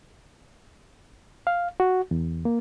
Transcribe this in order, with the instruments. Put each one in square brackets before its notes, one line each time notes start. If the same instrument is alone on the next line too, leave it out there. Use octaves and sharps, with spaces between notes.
[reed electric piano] F5
F#4
E2
A#3